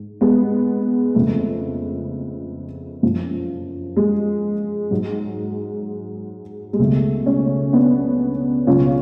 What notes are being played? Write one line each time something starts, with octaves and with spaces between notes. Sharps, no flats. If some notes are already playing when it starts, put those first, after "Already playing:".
Already playing: G#2
G#3 B3
F2 C#3 F3 A3
F#2 F3
G#3
G#2 F#3
G#3
C#2 B2 F#3 A3
A3 C#4
B3 D4
C#2 B2 F#3 C#4 F4